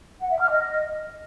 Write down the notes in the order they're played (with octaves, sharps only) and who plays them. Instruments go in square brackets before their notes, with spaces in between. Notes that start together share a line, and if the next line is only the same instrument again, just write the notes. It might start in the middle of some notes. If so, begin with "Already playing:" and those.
[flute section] F#5
E5
F6
D#5